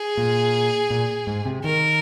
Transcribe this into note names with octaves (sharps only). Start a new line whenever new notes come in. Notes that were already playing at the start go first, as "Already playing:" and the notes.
Already playing: G#4
A#2
A#2
G#2
C3
D#3 A#4